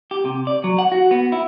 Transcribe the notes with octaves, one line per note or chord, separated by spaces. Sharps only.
G4
C3
D5
F#3
F#5
F#4
B3
E4